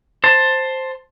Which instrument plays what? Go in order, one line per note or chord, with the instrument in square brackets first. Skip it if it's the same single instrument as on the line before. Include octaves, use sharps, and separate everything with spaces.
[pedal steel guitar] C5 A5